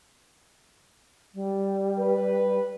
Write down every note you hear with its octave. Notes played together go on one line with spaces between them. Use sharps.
G3
B4